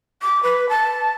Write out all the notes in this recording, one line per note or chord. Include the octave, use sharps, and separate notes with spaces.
D6
B4
A5